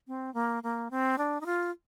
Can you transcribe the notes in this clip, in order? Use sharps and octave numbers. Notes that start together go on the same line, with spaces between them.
C4
A#3
A#3
C4
D4
D#4
F4